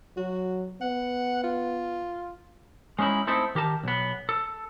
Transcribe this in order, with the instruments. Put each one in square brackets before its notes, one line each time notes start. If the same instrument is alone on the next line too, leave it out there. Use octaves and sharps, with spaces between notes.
[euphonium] F#3 [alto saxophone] F#4
[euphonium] B3 [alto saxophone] F#5
[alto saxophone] F4
[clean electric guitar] G#3 C#4 D#4 E4
A3 C4 D#4 E4 A4
D#3 G4 A#4 A5
B1 B3
A4